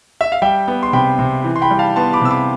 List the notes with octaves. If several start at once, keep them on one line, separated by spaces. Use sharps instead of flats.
E5
F5
G3 E5 G5
B3
C6
C3 G5 B5
C3
E3
C6
G5 B5
G3
F5 A5
B3 A5 C6
B5 D6
C3 E6
B5 D6